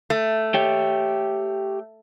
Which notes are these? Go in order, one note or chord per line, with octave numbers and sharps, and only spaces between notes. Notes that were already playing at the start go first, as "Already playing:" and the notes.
A3
G4 C#5 G5